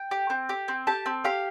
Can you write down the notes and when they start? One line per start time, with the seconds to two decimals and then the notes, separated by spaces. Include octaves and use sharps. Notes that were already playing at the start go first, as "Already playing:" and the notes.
Already playing: G5
0.11 G4
0.30 C4
0.49 G4
0.68 C4
0.87 G4 A5
1.06 C4
1.24 G4 F5